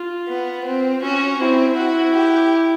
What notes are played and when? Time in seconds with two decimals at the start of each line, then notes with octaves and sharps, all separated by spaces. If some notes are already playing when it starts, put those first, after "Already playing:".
Already playing: F4
0.28 B3
0.65 C4
1.02 C#4 F#4
1.39 C4 E4
1.77 F#4
2.14 G4